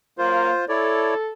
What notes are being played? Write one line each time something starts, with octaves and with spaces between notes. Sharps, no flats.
F#3 A#3 F4 C5
E4 A4 C#5 D5